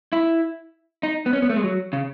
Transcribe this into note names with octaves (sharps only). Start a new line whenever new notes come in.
E4
D#4
B3
C#4
B3
A3
G#3
F#3
C#3